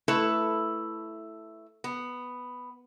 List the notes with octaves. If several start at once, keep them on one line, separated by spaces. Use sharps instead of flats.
A3 E4 A4 B4
B3